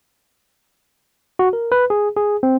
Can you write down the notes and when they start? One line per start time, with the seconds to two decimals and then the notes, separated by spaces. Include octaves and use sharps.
1.39 F#4
1.53 A#4
1.72 B4
1.90 G#4
2.17 G#4
2.43 C4